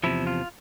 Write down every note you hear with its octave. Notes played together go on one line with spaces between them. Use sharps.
E2 C3 F3 E4
F4